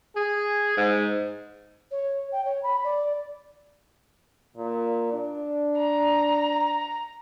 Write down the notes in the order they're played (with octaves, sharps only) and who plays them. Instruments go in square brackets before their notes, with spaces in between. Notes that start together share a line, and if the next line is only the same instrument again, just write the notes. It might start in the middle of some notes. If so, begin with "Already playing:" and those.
[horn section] G#4
G#2
[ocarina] C#5
G5
C#5
B5
D5
[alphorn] A#2
D4
[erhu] A#5